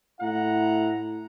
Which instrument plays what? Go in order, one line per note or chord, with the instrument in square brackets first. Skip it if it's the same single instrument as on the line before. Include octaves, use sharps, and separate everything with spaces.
[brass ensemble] A2 E4 F#5 A#5